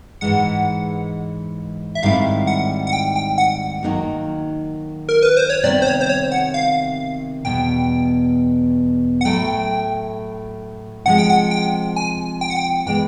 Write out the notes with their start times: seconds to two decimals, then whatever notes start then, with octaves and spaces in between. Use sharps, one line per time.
0.21 G#2 E3 G#3 F#5
1.95 E5
2.03 G#2 D#3 G3 C4 E4 F5
2.47 F#5
2.87 F#5
2.93 G5
3.16 G5
3.38 F#5
3.83 D#3 F#3 A#3 D#4 F#4
5.09 A#4
5.23 B4
5.37 C5
5.50 C#5
5.63 C3 D#3 G3 B3 D5
5.82 C5
5.87 C#5
6.01 C5
6.09 C#5
6.32 F#5
6.54 F5
7.45 E2 B2 G3 G5
9.21 F#5
9.25 A2 F#3 A3 G5
11.06 C3 F3 G#3 F#5
11.18 G5
11.30 F#5
11.51 G5
11.96 G#5
12.41 G5
12.50 F#5
12.56 G5
12.86 E3 G#3 B3 G5